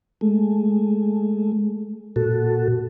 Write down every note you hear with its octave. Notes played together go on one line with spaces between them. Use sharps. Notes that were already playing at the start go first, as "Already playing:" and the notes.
G#3 A3
A#2 F#4 A4